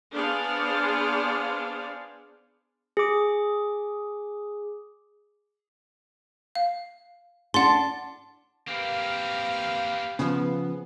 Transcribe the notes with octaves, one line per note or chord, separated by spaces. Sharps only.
B3 D4 G#4 C5 D5 F5
G#4 D6
F5
D4 F#5 A5 C6
A#3 C4 G4 B4 F5
C#3 F3 B3